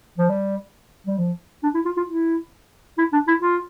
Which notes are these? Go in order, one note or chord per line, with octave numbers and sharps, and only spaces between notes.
F3
G3
G3
F3
D4
E4
F4
F4
E4
E4
D4
E4
F4